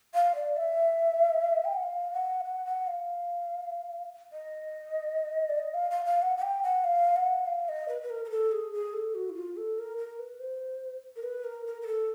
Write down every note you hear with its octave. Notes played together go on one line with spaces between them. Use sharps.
F5
D5
E5
G5
F#5
F5
F#5
F5
F#5
F#5
F5
D#5
D5
D#5
F5
F5
F5
F#5
F#5
G5
F#5
F5
F#5
F5
D#5
B4
B4
A#4
A#4
A4
G#4
G#4
A4
F#4
E4
F4
A4
A#4
A#4
B4
C5
A#4
B4
A#4
A#4
A#4
A4